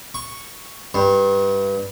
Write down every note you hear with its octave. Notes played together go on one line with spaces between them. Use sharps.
C#6
G2